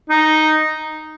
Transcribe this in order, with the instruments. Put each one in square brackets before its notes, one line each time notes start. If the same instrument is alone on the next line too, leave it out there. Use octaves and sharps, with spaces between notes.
[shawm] D#4